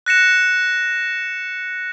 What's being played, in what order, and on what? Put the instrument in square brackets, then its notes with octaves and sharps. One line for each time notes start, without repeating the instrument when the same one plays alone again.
[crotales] F#6 A#6 C#7 E7